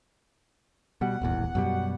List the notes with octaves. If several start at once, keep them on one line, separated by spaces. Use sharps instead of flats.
B2 G3 F#5
D#1 A1 E2
F#2 B2 G3